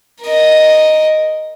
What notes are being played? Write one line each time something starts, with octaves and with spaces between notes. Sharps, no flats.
A#4 D#5